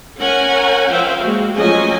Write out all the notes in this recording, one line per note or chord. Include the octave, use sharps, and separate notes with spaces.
C#4 A#4 F#5 G#5
F3 C5 E5 F5 G5
G#3 A#3 F#4
F3 F#3 A3 C#4 D#5 G#5